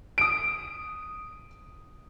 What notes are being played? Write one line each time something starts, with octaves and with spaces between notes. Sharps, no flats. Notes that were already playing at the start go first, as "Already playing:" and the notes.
D#6 D7